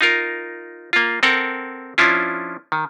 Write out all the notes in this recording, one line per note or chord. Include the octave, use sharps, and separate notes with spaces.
D#4 F4 A#4
A#3 F4
C4 A4 A#4 F#5 G5
F3 C#4 D4 E4 F4
D#3